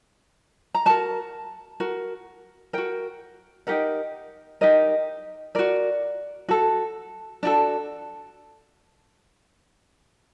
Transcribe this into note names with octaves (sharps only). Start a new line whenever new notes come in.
A#5
F#4 A#4 A5
F#4 A#4
F#4 A#4 G5
D#4 G4 A#4 F#5
D#4 G4 A#4 D#5
F#4 A#4 D5
F#4 A4
D4 F#4 A4